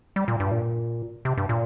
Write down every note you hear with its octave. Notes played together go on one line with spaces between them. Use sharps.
G3
A#2
G2
A#2
C3
G2
A#2